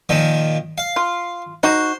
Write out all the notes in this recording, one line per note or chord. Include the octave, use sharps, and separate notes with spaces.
A#2 D#3 F3
F5
F4
D#4 F#4 C5